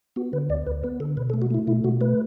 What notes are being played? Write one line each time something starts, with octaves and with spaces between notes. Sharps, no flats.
B3 F#4
D3 B4
D2 D5
D2 B4
B3 B4
D3 A4
B2 B4
A4
A3
F#4
A3 E4
B2 E4
B2 F#4
A3 B4